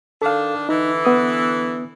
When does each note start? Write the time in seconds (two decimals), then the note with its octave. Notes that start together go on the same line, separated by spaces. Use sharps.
0.22 D#3 D4 A4 F5
0.69 D3 E3 D#4
1.05 B3 D#6